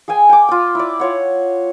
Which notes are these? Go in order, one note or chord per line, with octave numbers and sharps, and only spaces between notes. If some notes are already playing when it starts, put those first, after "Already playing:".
G#4 F5 G5 G#5
G5 D6
F4 G5
E4 D5
F4 C#5 F#5